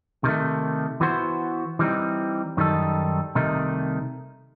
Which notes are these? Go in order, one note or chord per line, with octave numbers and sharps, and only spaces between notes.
C3 D#3 A3
E3 B3 F#4 C5
E3 G3 C4 D#4
F#2 D#3 G3 D#4 A4
C2 C3 D#3 A3 D#4